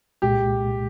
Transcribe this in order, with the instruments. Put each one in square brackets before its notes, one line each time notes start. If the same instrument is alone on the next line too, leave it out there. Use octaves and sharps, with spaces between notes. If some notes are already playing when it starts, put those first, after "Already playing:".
[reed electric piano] C2 A#2 G#3 [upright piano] G4